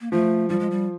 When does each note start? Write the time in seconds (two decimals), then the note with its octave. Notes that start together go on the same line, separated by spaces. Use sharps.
0.01 A#3
0.12 F3 A3
0.49 F3 G3
0.60 G#3
0.71 G3